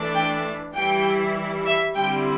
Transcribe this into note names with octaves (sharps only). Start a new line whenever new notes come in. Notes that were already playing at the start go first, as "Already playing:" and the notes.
Already playing: E3 A3 D4
G5
E3 G3 E4 G5
E5
D3 G3 C4 E4 G5